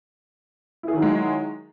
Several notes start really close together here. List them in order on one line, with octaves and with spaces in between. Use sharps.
E4 G#4 D#3 F#3 G#3